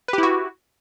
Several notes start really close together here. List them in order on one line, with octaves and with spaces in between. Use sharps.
B4 G4 E4 F#4